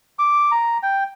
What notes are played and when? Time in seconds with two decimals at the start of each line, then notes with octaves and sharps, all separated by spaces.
0.19 D6
0.51 A#5
0.83 G5